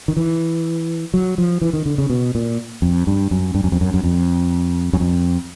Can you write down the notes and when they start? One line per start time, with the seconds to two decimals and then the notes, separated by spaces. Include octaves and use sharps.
0.08 D#3
0.17 E3
1.14 F#3
1.38 F3
1.61 E3
1.73 D#3
1.86 D3
1.98 C#3
2.10 B2
2.35 A#2
2.82 F2
3.07 G2
3.31 F#2
3.55 G2
3.64 F#2
3.72 F2
3.81 F#2
3.94 F#2
4.04 F2
4.93 F#2
5.00 F2